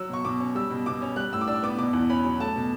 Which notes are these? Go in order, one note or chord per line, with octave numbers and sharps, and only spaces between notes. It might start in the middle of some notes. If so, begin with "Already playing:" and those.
Already playing: F#3 E6
B2 C#6
B2 D6
C#4
G3 E6
B2
B2 D6
C#4
G3 F#6
A2 E6
D6
D4 E6
B3 D6
B2 D6
E2
C#4 B5
F#3
A3 A5
B2